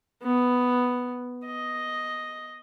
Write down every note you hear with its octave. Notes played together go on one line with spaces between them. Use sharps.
B3
D#5